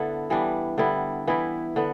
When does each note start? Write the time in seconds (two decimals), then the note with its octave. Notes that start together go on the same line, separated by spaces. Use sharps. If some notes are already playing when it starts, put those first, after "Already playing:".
Already playing: D3 B3 E4 A4
0.30 E3 G3 B3 D4
0.78 D3 G3 B3 E4
1.27 E3 B3 E4
1.76 D3 B3